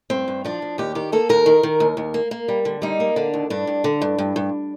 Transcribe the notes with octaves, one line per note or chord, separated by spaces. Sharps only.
G2 C4
G2
F3 D4
F3
D#2 G4
D#3 G4
A#3 A4
D#2 A#4
D#3
D#3
D#2
D#2
A#3
A#3
G3
D3
G3 D#4
A#3
D3 D4
D#2
G2 D4
G2
D3
G2
G2
G2